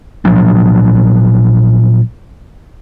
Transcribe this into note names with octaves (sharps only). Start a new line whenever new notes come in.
A#2 F3 F#3 D4